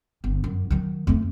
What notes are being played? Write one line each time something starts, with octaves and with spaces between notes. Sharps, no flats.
G1
F#2
D#3 F#3
F2 A3